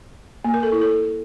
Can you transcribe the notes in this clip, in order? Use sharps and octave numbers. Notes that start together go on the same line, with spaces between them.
A#3
A#4
A4
E4
A4